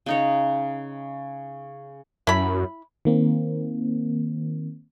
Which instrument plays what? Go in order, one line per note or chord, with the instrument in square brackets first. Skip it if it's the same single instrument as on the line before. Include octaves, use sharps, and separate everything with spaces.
[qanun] C#3 D#4 C#5
[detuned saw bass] F#2 [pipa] E4 B5
[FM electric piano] D#3 A#3 C4